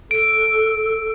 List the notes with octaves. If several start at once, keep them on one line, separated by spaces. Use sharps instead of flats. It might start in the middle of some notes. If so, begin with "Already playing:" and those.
A4 D7